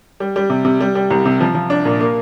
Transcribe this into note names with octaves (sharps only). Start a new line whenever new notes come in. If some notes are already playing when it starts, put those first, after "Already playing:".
G3
G3
C3
C3
G3
G3
C2
C3
F3
F3
D4
A#2
A#3